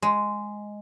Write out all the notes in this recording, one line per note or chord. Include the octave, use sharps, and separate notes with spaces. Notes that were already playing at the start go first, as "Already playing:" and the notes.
G#3